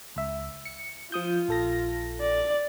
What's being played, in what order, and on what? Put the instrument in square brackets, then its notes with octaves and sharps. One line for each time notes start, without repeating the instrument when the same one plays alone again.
[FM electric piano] C#2 E5
C#7
[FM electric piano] F3 D#6 G6 [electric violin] F4
[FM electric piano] A#1 A4 A#6
[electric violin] D5